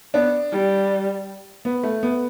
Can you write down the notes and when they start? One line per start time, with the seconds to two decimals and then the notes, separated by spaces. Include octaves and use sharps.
0.14 B3 D4
0.52 G3
1.65 B3
1.83 A3
2.03 B3